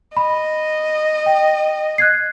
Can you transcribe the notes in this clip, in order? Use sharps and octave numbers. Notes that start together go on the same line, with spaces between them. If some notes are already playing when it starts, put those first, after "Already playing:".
D#5 B5
G5
F#6 G#6 C7